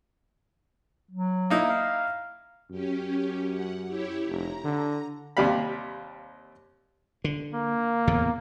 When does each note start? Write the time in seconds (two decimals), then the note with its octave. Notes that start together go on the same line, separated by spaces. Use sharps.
1.11 F#3
1.50 A#3 D#4 E4
1.69 F5
2.71 F#2 C#4 G4
3.49 F#5
3.87 E4 G4 C#5
4.28 F1 A#5
4.64 D3
5.37 D#2 C3 G3 F5 B5
7.24 D3
7.54 A#3
8.07 E2 A2 C#3